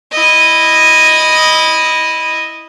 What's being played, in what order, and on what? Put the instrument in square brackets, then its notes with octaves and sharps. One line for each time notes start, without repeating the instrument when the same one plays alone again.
[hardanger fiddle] E4 D#5